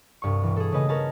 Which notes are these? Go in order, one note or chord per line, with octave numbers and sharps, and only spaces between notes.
C2 G2 C#6
B2 E3
G#4 A4
C#3 A3 A#3 B4 D#5 G#5
C#4 A#4 B4 C#5 G#5 A5